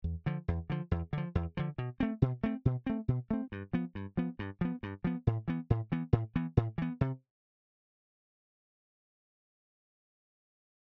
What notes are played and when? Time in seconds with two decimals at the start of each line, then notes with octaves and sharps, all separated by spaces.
0.04 E2
0.26 D3 F3
0.48 E2
0.70 D3 F3
0.91 E2
1.13 D3 F3
1.35 E2
1.57 D3 F3
1.78 B2
2.00 A3 C4
2.22 B2
2.44 A3 C4
2.65 B2
2.86 A3 C4
3.08 B2
3.31 A3 C4
3.52 G2
3.73 F3 B3
3.95 G2
4.17 F3 B3
4.39 G2
4.61 F3 B3
4.83 G2
5.04 F3 B3
5.27 A2
5.48 E3 B3
5.70 A2
5.92 E3 B3
6.13 A2
6.36 E3 B3
6.57 A2
6.78 E3 B3
7.01 C3